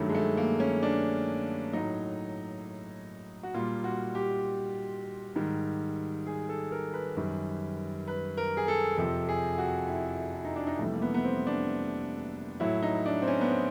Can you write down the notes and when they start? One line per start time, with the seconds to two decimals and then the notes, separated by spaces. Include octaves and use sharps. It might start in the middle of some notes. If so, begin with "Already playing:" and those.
Already playing: G2 D#3 F#3 A3
0.09 G#3
0.15 A3
0.37 A#3
0.60 C#4
0.83 D4
1.73 A2 F#3 D#4
3.43 F#4
3.54 A#2 G3 F4
3.84 F#4
4.15 G4
5.36 G#2 D#3 G3
6.27 G#4
6.49 A4
6.72 A#4
6.93 B4
7.17 F#2 D#3 G3
8.08 B4
8.37 A#4
8.57 G#4
8.68 A4
8.97 F2 C3 F3 A4
9.29 G#4
9.58 F#4
9.88 E4
10.34 E4
10.45 D#4
10.56 D4
10.67 D#4
10.79 F2 C3 E3 G3 A3
10.94 A#3
11.02 B3
11.14 B3
11.24 C4
11.47 D4
12.60 A2 F#3 E4
12.82 D#4
13.06 D4
13.22 C4
13.28 C#4
13.41 B3
13.51 C4